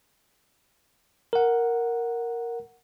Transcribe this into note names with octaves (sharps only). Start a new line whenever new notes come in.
A#4 F#5